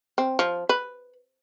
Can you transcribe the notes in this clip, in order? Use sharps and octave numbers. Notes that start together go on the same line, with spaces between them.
C4
F3
B4